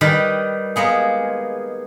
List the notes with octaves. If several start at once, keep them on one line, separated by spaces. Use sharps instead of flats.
D#3 G3 B4
G#3 A#3 B3 G#4